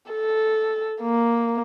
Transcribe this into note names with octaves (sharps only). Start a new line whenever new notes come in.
A4
A#3